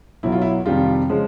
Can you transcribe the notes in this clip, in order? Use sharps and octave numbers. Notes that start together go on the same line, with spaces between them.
B1 B2 F#3 E4
F4
E4
F2 C3 D#3 G3 F4
C#3 F3 G#3